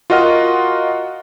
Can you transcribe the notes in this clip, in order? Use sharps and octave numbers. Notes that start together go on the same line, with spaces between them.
F4 F#4 A#4 D#5 F#5 F6